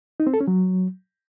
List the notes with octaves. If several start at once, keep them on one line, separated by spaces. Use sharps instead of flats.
D#4
C4
A4
C#4
F#3